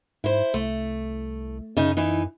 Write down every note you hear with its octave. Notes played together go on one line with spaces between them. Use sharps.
G#2 E4 C5
C2 A3
F#2 C#3 D#4
E3 D#4